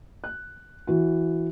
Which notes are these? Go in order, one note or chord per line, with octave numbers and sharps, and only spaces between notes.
F#6
E3 F#4